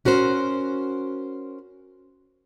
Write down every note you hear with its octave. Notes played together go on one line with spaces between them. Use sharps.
C#4 F#4 A#4 C5